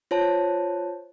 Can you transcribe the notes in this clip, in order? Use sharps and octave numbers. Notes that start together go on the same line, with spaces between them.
F4 C5 C#5 A5